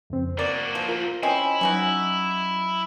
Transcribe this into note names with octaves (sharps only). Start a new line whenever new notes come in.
F2 C#3 C4
A#3 F#4 A#4 D5
F3
F4 A#4
C4 C#4 E4 D#5
F#3 C#4 D#4 F#4